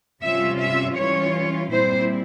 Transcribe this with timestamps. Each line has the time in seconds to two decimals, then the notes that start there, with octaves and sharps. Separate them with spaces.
0.23 C3 G3 C#4 F4 E5
0.60 E5
0.97 E3 G3 C#4 F4 C#5
1.71 A#2 G3 C4 E4 C5